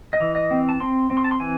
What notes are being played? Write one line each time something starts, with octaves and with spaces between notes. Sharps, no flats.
D#5
E3
D#5
C4
A5
C4 C6
C4
C6
A5
C6
E3 G#5